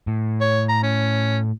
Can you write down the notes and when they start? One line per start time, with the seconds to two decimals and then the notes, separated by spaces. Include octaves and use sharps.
0.07 A2
0.41 C#5
0.69 A#5
0.83 C#4